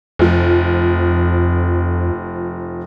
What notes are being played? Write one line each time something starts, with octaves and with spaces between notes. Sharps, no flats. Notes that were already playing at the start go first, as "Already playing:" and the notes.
F1 F2 F3